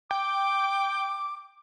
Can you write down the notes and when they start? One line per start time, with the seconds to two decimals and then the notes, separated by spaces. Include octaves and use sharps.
0.11 G5 D6